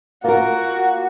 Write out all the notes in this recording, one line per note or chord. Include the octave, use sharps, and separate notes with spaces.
A#3 F4 F#4 A#4